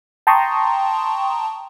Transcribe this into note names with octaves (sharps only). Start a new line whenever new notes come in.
G5 A5 A#5 C6 C#6 D#6